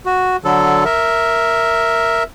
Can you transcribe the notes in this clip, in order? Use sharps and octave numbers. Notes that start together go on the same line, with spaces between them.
F#4
D3 F#3 A4
A#4 E5